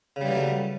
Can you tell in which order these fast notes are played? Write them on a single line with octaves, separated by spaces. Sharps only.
C#3 G3 E3 F#3 A3